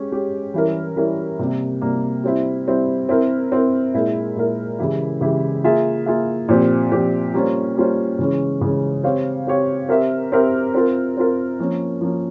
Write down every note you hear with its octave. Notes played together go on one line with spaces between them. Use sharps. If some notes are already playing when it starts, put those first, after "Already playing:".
Already playing: G#3 C#4 G4
G#3 C#4 G4
E3 G3 C#4 E4 A#4
E3 G3 C#4 E4 A#4
C3 G3 A#3
C3 G3 A#3
G3 C4 E4
G3 C4 E4
C4 E4 A#4
C4 E4 A#4
A#2 G#3 E4 A#4
A#2 G#3 E4 A#4
C#3 E3 G#3 E4 G4
C#3 E3 G#3 E4 G4
A#3 F4 G#4 E5
A#3 F4 G#4 E5
A#2 F3 C4 G4
A#2 F3 C4 G4
G3 A#3 C#4 F4 C5
G3 A#3 C#4 F4 C5
C#3 E3 G#3 C#4
C#3 E3 G#3 C#4
C4 G4 C#5 F5
C4 G4 C#5 F5
C4 G4 A#4 E5
C4 G4 A#4 E5
C4 F4 A#4
C4 F4 A#4
F3 A#3 C#4
F3 A#3 C#4